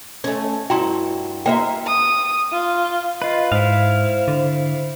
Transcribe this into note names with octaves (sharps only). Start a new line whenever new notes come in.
A3 C#4
G2 E4 F#4 G5 A#5 C6
A#3 F#4 B4 D#5 E5 G5
D#6
F4
F4 B4 D#5
G#2 E4 C5 F5
D3